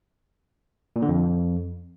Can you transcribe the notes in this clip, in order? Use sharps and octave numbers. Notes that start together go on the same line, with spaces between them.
A#2
D3
F2